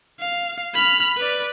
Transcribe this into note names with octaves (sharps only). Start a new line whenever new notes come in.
F5
B5 F6
B4 D5